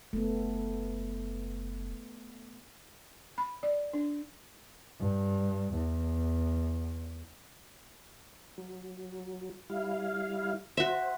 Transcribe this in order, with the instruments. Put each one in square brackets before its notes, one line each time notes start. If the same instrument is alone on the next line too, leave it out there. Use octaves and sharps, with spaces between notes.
[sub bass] F#1 [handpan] A3 B3
[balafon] B5
D5
D4
[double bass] G2
E2
[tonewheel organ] F#3
G3 E4 F5
[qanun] F#4 E5 [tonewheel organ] C5